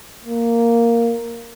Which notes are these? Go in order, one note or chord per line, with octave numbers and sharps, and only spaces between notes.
A#3